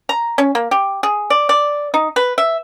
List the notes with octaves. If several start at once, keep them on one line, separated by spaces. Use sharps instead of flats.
A#5
C#4
A#3
G4
G#4
D5
D5
D#4
B4
E5